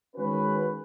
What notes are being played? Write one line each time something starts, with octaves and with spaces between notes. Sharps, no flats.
D#3 G#3 C#4 F#4 B4